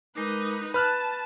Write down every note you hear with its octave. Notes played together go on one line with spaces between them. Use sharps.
G#3 D#4 A#4 B4 D6
B4 A5 B5 F6 F#6